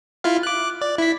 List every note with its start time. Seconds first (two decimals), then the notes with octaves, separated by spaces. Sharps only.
0.24 E4 F4 F5
0.43 D6 F#6
0.81 D5
0.98 E4 B6